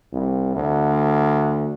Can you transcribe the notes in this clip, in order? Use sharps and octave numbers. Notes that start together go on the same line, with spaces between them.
C2
D2